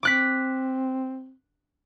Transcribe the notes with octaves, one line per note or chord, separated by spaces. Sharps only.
C4 D6 F#6 B6